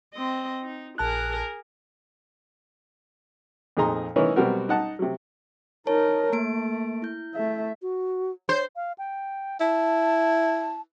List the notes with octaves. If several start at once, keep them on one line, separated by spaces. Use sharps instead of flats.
C4 D#5
D#4
A#1 G#4 A#4 A5 F#6
F2 A#2 D#4 G#4 A#5 C6
E3 C#4 D#4 E4 A#4 C#5
B2 F#3 G3 C4 F#4 A#4
D#4 F#5 A5
C3 F#3
D#4 A#4 C#5 A5
A3 A#3 D7
E4 G6
A3 E5
F#4
C5 C#5
F5
G5
E4 A5